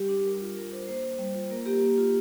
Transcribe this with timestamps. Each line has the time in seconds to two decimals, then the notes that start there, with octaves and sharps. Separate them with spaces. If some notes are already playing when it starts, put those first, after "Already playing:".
Already playing: G3 G4
0.08 D4
0.25 G3 A#4
0.41 F4
0.56 G3 A#4
0.71 D4 C5
0.87 A#3 C5
1.04 A#3
1.19 G3
1.34 F4
1.51 A#3 A#4
1.66 A#3 G4
1.82 A#3
1.98 F4